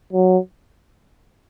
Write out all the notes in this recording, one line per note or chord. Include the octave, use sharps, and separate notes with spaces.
F#3